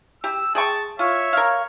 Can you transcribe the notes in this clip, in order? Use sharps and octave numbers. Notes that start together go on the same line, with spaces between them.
G4 E6
G#4 G5 A5 C#6
F4 C#5 E5
A#4 F5